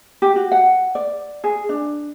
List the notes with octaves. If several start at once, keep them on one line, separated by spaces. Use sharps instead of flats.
G4
F#4
F#5
D5
G#4
D4